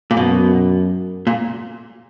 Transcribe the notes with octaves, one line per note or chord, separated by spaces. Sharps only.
A#2
F#2 B2
A#2